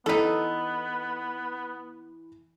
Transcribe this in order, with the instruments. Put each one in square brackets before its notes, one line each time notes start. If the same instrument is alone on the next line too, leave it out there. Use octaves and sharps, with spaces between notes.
[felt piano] E3 B6 [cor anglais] B3 [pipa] D#4 A4